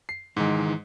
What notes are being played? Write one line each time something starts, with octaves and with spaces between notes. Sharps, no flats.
C7
G#2 D#3 E3 G#3 D#4